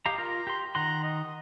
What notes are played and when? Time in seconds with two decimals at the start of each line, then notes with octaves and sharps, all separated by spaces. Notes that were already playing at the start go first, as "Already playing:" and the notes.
0.06 G4 D#5 F5 A#5
0.18 F4 A#4 A#5
0.47 G4 C6
0.75 D#3 F#5 A#5 C6
1.04 D#5